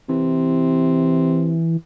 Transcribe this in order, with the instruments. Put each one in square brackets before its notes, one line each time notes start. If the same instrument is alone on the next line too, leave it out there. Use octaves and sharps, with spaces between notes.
[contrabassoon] C3 [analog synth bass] E3